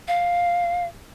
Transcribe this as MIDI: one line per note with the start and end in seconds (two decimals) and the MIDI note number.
0.08 0.86 77